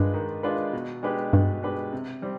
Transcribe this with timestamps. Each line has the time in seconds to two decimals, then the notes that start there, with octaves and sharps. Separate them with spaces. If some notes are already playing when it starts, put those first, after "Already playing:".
Already playing: G2 D#3 G#3 D4 F4 B4
0.14 D#3
0.43 G#3 D4 F4 B4
0.73 B2
1.03 G#3 D4 G4 B4
1.33 G2 B2
1.63 G#3 D4 G4 B4
1.93 C3
2.22 G3 C4